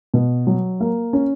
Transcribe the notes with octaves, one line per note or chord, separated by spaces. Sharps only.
B2
F#3
A#3
C#4